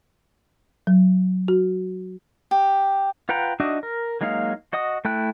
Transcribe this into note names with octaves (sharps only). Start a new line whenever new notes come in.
F#3
F#4
G4
F4 B4 F#5 G5 A#5
D4 D#4 F#4 D#5 E5
A#4
F#3 G#3 A#3 D#4 F5
F#4 D#5 F#5 D#6
A3 E4 G5 F#6